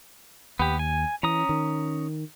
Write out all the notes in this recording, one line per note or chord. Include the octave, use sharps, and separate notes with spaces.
D#2 B3 G4
G#5
E3 C#4 A#5 D#6
D#3